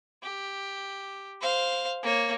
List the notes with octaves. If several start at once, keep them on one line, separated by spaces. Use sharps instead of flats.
G4
C5 F5
A#3 C#5